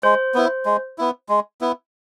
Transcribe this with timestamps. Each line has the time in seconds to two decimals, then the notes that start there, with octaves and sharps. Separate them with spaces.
0.03 G#3 C5
0.35 B3 E4
0.66 G#3
0.98 B3 E4
1.29 G#3
1.61 B3 E4